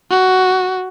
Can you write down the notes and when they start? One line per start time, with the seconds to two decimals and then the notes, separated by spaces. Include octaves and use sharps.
0.10 F#4